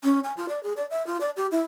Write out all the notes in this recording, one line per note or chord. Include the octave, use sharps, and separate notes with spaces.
C#4
G#5
F4
D5
G#4
D5
E5
F4
D5
G4
E4